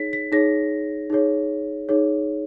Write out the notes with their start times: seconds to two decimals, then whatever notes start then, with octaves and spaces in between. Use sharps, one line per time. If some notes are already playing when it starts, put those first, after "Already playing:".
Already playing: D#4 G#4 C#5 B6
0.13 B6
0.32 D#4 G#4 C#5 A#6
1.10 D#4 G#4 C#5
1.89 D#4 G#4 C#5